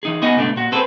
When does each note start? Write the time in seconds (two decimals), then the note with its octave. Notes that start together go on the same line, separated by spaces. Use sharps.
0.03 E3 D#4 G#4
0.22 B3 D#4 F#4 D#5 G#5
0.36 C#2 G2 B2 A3 D4
0.56 A#2 F#4
0.72 C4 G#4 A4 B4 C5